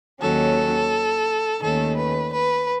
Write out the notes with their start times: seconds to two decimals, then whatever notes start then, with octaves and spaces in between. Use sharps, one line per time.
0.20 D#2 D#3 F#3 C#4 A4
1.62 D#2 D#3 A3 C#4 A4
1.96 B4
2.33 B4